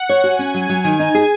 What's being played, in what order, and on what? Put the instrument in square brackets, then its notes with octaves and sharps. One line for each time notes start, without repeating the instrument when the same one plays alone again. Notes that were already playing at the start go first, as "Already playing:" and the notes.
Already playing: [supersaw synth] F#5
[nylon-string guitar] C#5
[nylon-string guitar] F#4 [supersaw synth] G#5
[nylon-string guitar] C#4
F#3
F#3
D#3
D#4
G#4